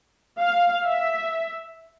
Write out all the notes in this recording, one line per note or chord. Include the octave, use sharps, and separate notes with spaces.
F5
E5